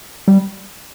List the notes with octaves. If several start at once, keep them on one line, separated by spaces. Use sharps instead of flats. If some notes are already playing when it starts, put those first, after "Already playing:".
G3